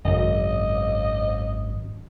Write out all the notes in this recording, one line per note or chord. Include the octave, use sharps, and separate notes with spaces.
G#1 F#2 C#3 D#5